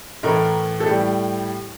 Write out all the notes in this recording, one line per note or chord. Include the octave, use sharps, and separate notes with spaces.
A2 E3 A3 A#4
A4
A2 G3 G4